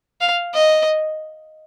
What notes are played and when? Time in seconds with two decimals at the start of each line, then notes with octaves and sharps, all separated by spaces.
0.21 F5
0.55 D#5